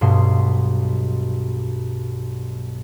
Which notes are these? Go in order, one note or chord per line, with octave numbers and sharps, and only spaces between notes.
B1 G2 B2 C6